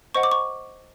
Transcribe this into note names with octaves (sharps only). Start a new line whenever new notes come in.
C5 D#5 F#5 C#6
D6
C#6